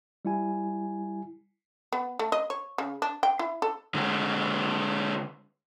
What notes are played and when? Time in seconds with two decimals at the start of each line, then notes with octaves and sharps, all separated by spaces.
0.25 G3 E4 G#5
1.93 B3
2.19 A3
2.32 D#5
2.50 C#5
2.78 C#3
3.02 D4
3.23 G5
3.39 E4
3.62 A4
3.94 D3 G#3